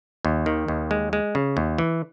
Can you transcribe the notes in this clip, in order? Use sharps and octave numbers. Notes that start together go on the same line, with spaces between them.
D#2
D#3
D#2
G#3
G#3
C#3
D#2
E3